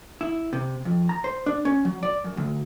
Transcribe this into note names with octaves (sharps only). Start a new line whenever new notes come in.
E4
C3
F2
A#5
C5
D4
C#4
F#3
D5
F#2
D2